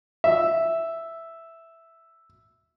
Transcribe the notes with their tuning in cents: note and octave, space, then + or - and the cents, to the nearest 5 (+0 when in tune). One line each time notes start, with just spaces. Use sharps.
E5 +0